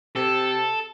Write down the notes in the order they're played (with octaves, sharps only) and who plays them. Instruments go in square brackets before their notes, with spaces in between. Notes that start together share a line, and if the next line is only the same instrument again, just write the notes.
[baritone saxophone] C3 [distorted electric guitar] A4